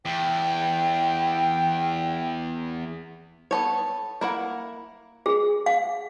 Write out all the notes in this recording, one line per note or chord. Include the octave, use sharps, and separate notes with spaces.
E2 G5
B3 A4 C#5
A#3 E4 F#5
G#4
F5